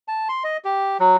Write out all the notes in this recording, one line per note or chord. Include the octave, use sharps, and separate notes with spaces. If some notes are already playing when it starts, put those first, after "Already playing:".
A5
C6
D#5
G4
F#3